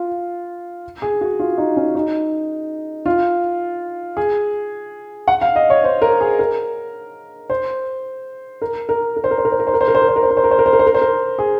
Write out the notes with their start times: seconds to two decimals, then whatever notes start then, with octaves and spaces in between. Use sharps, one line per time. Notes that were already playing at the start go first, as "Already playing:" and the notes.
Already playing: F4
1.02 G#4
1.21 F#4
1.39 F4
1.58 D#4
1.76 C#4
1.95 D#4
3.06 F4
4.17 G#4
5.28 F#5
5.41 F5
5.56 D#5
5.70 C#5
5.84 C5
6.02 A#4
6.21 G#4
6.39 A#4
7.50 C5
8.62 A#4
8.89 A#4
9.17 A#4
9.24 C5
9.31 A#4
9.38 C5
9.45 A#4
9.52 C5
9.60 A#4
9.67 C5
9.74 A#4
9.81 C5
9.88 A#4
9.95 C5
10.02 A#4
10.09 C5
10.16 A#4
10.23 C5
10.30 A#4
10.37 C5
10.44 A#4
10.51 C5
10.59 A#4
10.66 C5
10.73 A#4
10.79 C5
10.87 A#4
10.94 C5
11.02 A#4
11.39 G#4